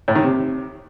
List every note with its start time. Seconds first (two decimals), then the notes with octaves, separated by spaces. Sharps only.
0.08 A2
0.15 D#3
0.23 C3